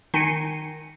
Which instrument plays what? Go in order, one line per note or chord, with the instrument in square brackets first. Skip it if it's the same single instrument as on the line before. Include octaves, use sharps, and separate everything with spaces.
[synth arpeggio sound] D#3 G#5 C7 C#7